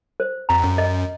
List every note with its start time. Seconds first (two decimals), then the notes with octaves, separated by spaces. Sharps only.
0.20 C5
0.49 F2 A#5
0.64 F#2
0.78 D#5